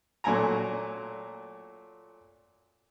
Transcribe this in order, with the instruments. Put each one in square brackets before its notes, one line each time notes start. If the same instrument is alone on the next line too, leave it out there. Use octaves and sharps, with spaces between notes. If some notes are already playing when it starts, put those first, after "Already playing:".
[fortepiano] A#2 F#3 A3 G#5 A#5